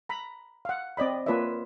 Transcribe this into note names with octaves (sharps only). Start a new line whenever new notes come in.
A#5 B5
F5 F#5
C4 D5 D#5 B5
A#3 F4 B4 C#5 D5 E5